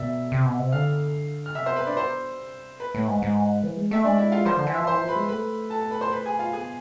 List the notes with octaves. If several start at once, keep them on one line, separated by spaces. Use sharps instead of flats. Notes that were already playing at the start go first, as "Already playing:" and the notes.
Already playing: B2 D5 E5 E6
C3
B2
C3
D3 F5 F6
F6
C3 E5 E6
C5 C6
B4 B5
D4 D5
B2 C5
C3
B4
A2
G#2
G#2
E3
G#3
A3 E5
G#3 D4 D5
E4 E5
F4 F5
F3 C5 C6
D3
E3
F3 E5 E6
E3 C5 C6
F3
B4 B5
G#3
A3 B4 B5
A4 A5
A4 A5
B4 B5
C5 C6
B4 B5
G#4 G#5
F4 F5
B3 G#4 G#5